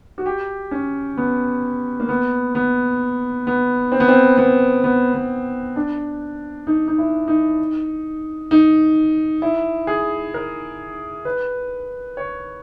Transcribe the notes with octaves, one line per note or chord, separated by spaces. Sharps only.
F#4
G4
C#4
B3
A#3
B3
B3
B3
C4
B3
C4
B3
B3
B3
D4
D#4
D#4
E4
D#4
D#4
E4
G#4
A#4
B4
C#5